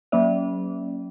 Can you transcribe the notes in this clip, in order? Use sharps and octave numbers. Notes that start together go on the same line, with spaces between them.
F#3 A#3 C#4 D5 E5